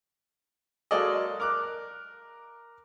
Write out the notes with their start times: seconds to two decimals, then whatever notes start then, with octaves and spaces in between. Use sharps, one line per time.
0.91 F#3 G#3 A#3 A4 D5 D#5
1.40 A#4 D6 F#6